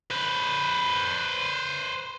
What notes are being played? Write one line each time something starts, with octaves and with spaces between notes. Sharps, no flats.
B4 C5